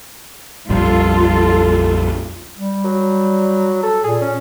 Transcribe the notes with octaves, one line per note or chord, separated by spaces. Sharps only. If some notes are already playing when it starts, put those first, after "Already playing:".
A#1 F2 G3 F4 A4
G3
F#3
A4
A#2 G#4
C#4